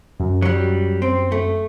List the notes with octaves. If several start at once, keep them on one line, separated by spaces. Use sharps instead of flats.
F#2
F#3 G3
C4
A3